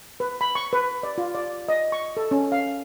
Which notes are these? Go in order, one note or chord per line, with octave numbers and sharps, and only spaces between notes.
B4
B5
C#6
B4
D5
F4
D5
D#5
C#6
A4
C#4
F5